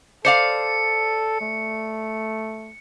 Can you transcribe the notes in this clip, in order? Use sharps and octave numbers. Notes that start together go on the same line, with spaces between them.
A4 C5 D5 F5 C#7
A3